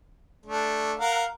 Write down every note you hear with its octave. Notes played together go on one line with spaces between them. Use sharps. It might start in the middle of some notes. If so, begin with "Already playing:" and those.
A3 D4
A#4 F5 F#5